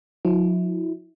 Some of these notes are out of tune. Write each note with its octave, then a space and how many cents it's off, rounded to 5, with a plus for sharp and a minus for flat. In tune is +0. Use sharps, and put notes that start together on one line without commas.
F#3 -45 E4 -25